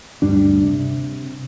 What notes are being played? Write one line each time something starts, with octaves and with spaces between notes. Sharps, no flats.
D2 G2 G3 D4
C3